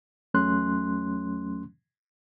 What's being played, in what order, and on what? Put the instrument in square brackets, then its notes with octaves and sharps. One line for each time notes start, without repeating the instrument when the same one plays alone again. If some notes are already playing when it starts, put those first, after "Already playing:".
[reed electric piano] E2 F#3 A3 C#4 C6 F#6